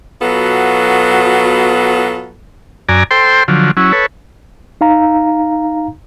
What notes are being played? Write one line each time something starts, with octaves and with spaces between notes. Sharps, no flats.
B2 F#3 B3 F4 A4
F#2 D5 G#5 A#5
A4 C5 G5 C6
D3 F3 F#3
F#3 C#4 E4
A4 B4 C#5
D#4 F5 A#5